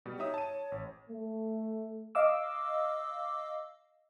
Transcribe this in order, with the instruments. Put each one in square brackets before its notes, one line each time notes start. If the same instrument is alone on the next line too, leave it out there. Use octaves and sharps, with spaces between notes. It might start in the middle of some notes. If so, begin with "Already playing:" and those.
[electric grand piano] B2 G3
[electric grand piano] D#4 E5 D#6 [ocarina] C#5
[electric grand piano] A5 D#7
A1
[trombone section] A3
[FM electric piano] D#5 F5 D6 E6